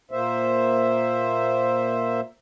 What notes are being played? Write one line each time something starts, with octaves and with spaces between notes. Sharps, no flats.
A#2 A#3 C5 E5